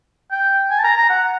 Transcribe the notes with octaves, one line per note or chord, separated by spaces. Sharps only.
G5
G#5
A5
A#5
A#5
F#5